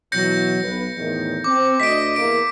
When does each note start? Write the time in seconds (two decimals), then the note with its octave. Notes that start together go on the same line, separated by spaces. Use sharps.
0.12 B2 E3 F#3 G6 A#6 C#7
0.62 B1 B4
0.96 E2 A2 D#3
1.44 C4 D6
1.80 D2 D#5 B6 D7
2.16 E2 A#3 D7